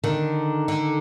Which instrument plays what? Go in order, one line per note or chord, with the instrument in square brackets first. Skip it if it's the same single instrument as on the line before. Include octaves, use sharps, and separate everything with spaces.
[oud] D3 [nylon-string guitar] D#3
[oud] D3